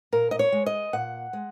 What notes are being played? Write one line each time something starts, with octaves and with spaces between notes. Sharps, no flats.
A#2 A#4
D#5
C#5
G#3
D#5
A#2 F#5
G#3